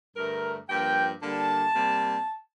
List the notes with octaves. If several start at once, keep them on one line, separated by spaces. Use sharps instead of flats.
G2 D3 A3 A#4
G2 F3 A#3 G5
D3 G3 A#3 A5
C3 G3 A#3